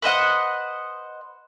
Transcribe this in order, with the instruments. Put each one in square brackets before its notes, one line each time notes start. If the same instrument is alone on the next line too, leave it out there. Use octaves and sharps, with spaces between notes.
[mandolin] B4 C5 D#5 F#5